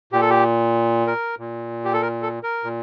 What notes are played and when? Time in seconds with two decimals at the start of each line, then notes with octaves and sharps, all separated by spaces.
0.13 A#2 G4
0.21 A4
0.30 G4
1.07 A#4
1.39 A#2
1.85 G4
1.93 A4
2.02 A#4
2.22 A4
2.43 A#4
2.64 A#2